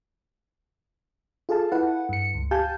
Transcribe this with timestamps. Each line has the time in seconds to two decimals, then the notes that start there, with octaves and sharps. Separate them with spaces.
1.49 F4 G#4 A4 F5 A5
1.72 E4 B4 F#5
2.09 G2 C#7
2.34 C#2
2.51 G4 F5 G#5 A5 G6